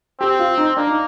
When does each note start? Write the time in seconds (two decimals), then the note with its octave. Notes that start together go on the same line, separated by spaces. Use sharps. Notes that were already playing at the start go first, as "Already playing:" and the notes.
0.20 C4 G4
0.39 F4
0.58 D#4
0.77 A#3 D4
0.87 D#4